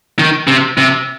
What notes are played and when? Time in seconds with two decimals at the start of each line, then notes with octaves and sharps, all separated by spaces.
0.19 D#3
0.48 C3
0.78 C3